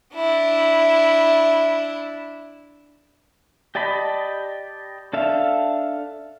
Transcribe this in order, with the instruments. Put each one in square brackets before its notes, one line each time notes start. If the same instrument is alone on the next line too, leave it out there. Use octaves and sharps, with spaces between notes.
[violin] D4 E4
[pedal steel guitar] G4 D5 D#5 A5 B5
D4 A4 E5 F5